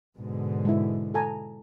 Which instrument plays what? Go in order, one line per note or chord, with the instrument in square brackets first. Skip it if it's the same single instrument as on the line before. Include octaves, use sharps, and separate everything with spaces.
[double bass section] G#2 B2 D3
[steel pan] G#3 E4
A4 G#5 A#5